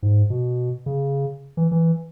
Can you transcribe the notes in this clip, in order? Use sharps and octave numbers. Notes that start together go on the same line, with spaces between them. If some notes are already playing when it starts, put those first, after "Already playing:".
G#2
B2
C#3
E3
E3